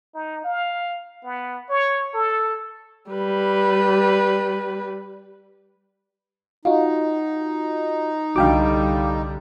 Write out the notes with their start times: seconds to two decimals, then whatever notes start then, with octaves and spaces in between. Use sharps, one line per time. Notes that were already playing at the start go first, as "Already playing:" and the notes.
0.14 D#4
0.44 F5
1.24 B3
1.70 C#5
2.14 A4
3.11 G3 B4
6.65 D#4 F4 F#4 D#5 F5
8.36 C2 D3 G3 D4 F#4 F5 G5 D6